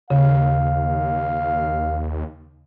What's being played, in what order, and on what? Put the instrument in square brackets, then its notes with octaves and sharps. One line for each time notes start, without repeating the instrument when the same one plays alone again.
[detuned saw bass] D#2 [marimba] C#3 [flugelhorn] F5